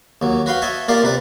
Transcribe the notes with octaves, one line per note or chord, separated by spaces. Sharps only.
D#2 F#3
F#4 B4 F5 G5
C#5 D#5 E5 A5
A#3 F4 G4 A#4 D5 F5
C3 B4 D5